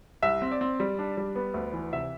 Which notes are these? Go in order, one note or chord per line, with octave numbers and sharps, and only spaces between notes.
C2 E5
C4
D5
C4
G3
D4
G3
B3
D2
E3
C3 E5